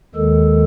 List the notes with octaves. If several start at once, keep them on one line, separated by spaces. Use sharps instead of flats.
D#2 D#3 G#3 A4